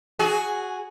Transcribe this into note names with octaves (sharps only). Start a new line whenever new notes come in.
F#4 G#4